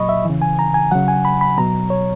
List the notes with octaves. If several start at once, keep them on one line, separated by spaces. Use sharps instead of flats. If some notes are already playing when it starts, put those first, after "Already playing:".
Already playing: A#2 F#3 D#5 B5 C#6
E5
C#3 E3
G#5
A#5
G#5
C#3 F#3 F#5
G#5
B5
B5
B2 F#3 A#5
C#5